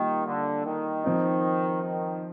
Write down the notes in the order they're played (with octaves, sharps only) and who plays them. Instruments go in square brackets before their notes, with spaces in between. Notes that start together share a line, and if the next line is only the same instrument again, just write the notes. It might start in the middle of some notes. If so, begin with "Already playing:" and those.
Already playing: [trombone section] D#3 [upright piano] G3 A#3 F4
[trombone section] D3
D#3
[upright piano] F3 C4 D#4
[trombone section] D#3